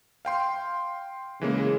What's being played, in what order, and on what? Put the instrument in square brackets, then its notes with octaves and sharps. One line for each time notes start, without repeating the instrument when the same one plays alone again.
[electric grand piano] F5 G5 C6
[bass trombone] C#3 [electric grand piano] E3 G#3 A#3